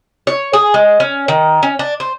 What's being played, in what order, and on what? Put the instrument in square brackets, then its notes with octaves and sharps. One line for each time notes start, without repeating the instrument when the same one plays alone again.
[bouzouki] C#5
G#4
G#3
C#4
D#3
C#4
D4
C5